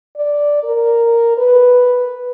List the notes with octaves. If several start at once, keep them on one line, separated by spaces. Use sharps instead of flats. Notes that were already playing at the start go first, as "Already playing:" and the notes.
D5
A#4
B4